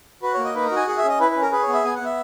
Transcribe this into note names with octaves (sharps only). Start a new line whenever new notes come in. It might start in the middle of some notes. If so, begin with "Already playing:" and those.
F#4 B4
A#3 C#5
D#5
D#4 B4
A#4
F#4
G#5
G#4 F#5
E5
C#4 D#5
E4 B4
C#4 B4
A#4
G#4 B4
C#5
B3
E5
B3 G#5
F#5
B3 E5